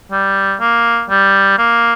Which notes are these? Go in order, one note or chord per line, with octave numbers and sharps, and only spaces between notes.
G3
A#3
G3
A#3